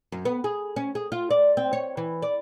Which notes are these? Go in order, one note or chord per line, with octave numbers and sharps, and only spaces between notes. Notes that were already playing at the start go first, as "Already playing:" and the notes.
F#2
B3
G#4
C#4
G#4
F4
D5
C4
C#5
E3
D5